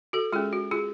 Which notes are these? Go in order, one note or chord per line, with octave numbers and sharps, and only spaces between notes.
F#4 A4
G#3 C#4 F4 G#4
F#4
F4 G#4